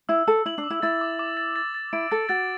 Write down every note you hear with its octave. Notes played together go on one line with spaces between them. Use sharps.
E4 E6
A4 E6
E4 F#7
D4
D6
E4
E4 A6
D6
D6
A6
A6
A6
E4 D7
A4 A6
F#4 A6